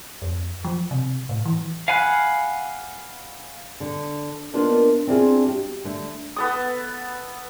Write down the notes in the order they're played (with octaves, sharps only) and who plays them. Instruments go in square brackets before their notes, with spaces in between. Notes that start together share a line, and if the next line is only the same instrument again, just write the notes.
[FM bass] F2
F3
C3
A2
E3
[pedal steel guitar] F5 F#5 G#5 B5 F#6
[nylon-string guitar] D3
A#3 B3 D4 D#4 F4 A#4
C4 D4 E4 F4 G#4
F#4 G4
D3 A3
[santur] B3 A4 D#6